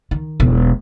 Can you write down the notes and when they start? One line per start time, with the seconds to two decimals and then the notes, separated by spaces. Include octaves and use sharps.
0.11 D#3
0.40 E1 B1